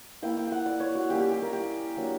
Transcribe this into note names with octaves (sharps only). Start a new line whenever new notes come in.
A#3 E4 G5
G5
F#5 G5
D5
C#5
F#4
G3 A#3 C#4 E4 G4
G4
G4
A#4
G4
F#3 A#3 D4